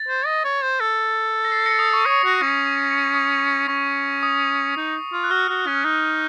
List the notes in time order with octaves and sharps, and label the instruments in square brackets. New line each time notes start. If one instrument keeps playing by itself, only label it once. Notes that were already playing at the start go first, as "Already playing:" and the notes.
Already playing: [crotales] A6
[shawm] C5
D#5
C#5
C5
A4
[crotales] A#6
C7
A#6 C#7
D#6
C#6
[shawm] C#5 [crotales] D#6
[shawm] F#4
C#4
[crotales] D#6
[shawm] C#4 [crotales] C#6
[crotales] D#6
[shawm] D#4
F4
[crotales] F#6
[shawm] F#4 [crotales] F6
[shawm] F#4
C#4
D#4